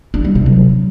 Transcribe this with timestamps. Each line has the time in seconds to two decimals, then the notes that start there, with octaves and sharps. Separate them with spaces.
0.14 D4
0.25 G3
0.35 C3
0.46 F#3